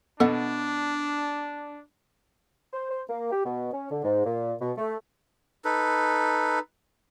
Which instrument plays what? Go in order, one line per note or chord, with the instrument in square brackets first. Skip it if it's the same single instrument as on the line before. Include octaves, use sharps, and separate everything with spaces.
[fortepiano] B2 [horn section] D4 [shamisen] A4 E5 F#5
[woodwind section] C5
C5
A#3
G4
B2
C#4
D3
G#2
A#2
B2
A3
[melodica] D#4 A4 B4